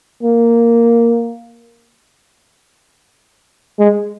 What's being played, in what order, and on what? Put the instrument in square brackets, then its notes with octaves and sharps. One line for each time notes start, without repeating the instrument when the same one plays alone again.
[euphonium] A#3
G#3